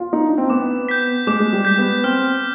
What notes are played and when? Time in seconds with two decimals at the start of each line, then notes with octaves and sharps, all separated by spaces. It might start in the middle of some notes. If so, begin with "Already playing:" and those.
0.00 F4
0.13 D#4
0.25 D4
0.38 C4
0.50 B3 D6
0.89 G6 B6
1.27 G#3 D6
1.40 G#3
1.53 G3
1.65 G6 B6
1.78 B3
2.04 C4 F6